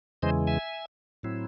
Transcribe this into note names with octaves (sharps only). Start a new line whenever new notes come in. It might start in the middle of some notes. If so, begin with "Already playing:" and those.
E2 C#3 E3 G#3 C5 D#5
E5 G#5
A2 F#3 C4 E4